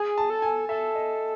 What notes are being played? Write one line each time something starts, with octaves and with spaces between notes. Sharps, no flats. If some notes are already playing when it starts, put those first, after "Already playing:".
Already playing: G#4 G#5
A5
A4
G#5
A4 E5
D#5